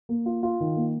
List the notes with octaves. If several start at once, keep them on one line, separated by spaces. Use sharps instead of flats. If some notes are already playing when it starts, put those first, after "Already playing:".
A#3
F4
F4
D#3
A#3